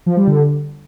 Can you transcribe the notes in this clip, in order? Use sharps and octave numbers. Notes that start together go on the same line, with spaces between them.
F3
G3
D3